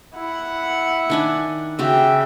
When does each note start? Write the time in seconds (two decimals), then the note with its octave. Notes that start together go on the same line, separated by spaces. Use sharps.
0.15 E4 F#5
1.10 D#3 D4 G#5
1.79 C#3 F#4 G4 E5 G5